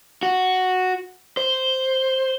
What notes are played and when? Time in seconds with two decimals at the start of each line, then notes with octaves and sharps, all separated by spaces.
0.23 F#4
1.37 C5